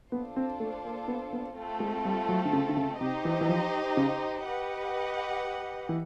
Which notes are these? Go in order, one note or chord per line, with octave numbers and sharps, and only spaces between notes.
B3 D4 F4 A4 C5
C4
A3
A#3
B3
B3
A3 C4 F4 A4
G#3
G3
F#3
D3
C#3
D3
C#3
C3 D#4 G4 C5 D#5
E3
E3
F3
C#3
G4 B4 D#5 F#5
E3